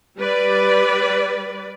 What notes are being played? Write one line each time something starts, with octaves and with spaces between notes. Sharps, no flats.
G3 B4 D5